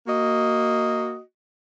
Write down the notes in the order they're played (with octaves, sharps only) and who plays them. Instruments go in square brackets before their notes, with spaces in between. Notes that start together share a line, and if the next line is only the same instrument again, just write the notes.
[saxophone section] A#3 F#4 D#5